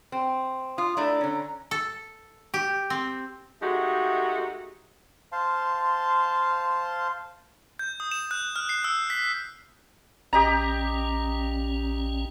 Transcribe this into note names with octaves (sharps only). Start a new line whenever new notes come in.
C4
F4 D#6
A3 D4 E4 A#5
D3 C#4
A4
G4
C4
G#3 A3 D#4 F#4 G4
C5 F5 A5 C6
G6
D#6
E7
F#6
F6
C7
E6
B6
A#1 C#4 G4 D#5 A#5